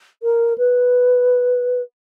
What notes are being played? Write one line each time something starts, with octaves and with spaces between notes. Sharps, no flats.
A#4
B4